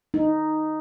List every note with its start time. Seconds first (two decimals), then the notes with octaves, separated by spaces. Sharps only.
0.14 D#4